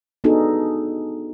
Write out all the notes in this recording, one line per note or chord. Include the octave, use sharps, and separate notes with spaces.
B3 D4 D#4 F#4 G#4 A4